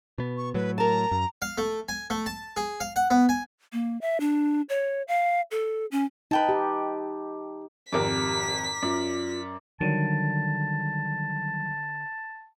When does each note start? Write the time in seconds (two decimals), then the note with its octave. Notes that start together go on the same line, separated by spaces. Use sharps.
0.18 B2 B3
0.37 C#6
0.54 A2 F#3 B4
0.78 A#4 A5 A#5
1.11 F#2
1.42 F5
1.58 A3
1.88 G#5
2.10 A3
2.26 A5
2.57 G#4
2.80 F5
2.96 F#5
3.11 B3
3.29 G#5
3.73 A#3
4.01 E5
4.20 D4
4.69 C#5
5.08 F5
5.51 A4
5.92 C#4
6.31 D#4 B4 G5 A5
6.49 G4
7.92 G#1 F2 G4 A#4 D5 D6 B6
8.82 F#2 F4 D5
9.81 D3 D#3 F#3 G3 A5